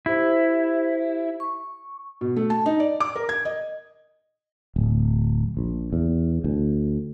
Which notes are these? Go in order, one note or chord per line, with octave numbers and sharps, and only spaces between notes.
E4 G4 C5
C#6
B2
A3
A5
D#4
D5
D6
A#4
G#6
D#5
D1
A#1
E2
D2